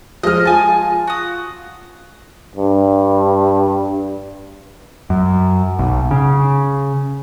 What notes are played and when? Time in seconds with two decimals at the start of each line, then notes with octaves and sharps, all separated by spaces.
0.23 F3 G#3 D#5 F6
0.45 F4 G#5 A5
1.07 F#4 D#6
2.56 G2
5.10 F#2
5.79 B1
6.11 C#3